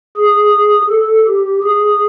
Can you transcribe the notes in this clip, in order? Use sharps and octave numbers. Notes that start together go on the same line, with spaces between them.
G#4
A4
G4
G#4